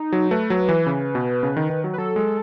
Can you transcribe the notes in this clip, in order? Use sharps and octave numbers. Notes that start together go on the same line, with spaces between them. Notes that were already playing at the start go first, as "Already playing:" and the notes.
Already playing: D#4
F#3
A3 B4
F#3
E3
C#3
B2
C#3
D#3
D#3
F#3
B4
F#3 A4
G#3